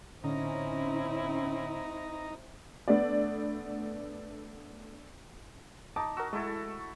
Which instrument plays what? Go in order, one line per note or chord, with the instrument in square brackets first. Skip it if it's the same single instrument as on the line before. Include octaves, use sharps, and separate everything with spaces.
[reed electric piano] A2 D3 [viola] C4 E4 [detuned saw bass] C#4 [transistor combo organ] D#4 A#5
[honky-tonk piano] A3 B3 D4 D5
[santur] D#4 [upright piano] A5 [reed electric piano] D6
[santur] F#4 [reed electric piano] A#4 E6
[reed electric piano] G#3 [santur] A3 E4 A4